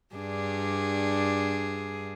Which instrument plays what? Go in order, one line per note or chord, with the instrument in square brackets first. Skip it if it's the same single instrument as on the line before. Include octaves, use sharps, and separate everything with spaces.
[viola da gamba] G2 D4 G#4